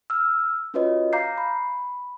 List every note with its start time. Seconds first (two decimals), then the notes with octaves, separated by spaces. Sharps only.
0.10 E6 F6
0.74 C#4 F4 F#4 B4 C#5 D#5
1.13 F5 A#5 D6 G6 C7
1.38 B5